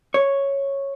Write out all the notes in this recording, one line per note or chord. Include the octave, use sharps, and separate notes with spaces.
C#5